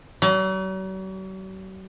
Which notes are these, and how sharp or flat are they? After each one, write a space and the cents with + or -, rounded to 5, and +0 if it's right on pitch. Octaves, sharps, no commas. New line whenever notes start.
F#3 +45